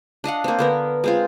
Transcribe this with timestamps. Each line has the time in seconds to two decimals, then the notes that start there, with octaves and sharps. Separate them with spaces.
0.24 D4 D#5 F5 F#5
0.44 A#3 C4
0.59 D3 B3 A#4
1.04 G#3 C4 F4